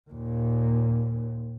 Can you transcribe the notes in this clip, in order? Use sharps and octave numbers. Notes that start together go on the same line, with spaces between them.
D#2 A#2